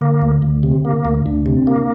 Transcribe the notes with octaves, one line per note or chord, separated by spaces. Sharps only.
D3 A#3
D2
D2
C3
A#3
D2
D2 D4
C3
C4
A#3